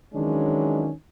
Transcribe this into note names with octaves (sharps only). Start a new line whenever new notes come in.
D#3 E3 F#3 G#3 C#4 D4